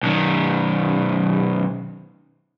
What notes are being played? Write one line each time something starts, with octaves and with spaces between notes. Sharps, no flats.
B1 D#3